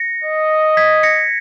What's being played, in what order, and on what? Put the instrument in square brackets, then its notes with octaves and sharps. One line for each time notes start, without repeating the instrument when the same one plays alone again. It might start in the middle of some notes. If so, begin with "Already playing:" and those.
Already playing: [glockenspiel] A#6 C#7
[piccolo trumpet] D#5
[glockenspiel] G#6 B6
A#6 C#7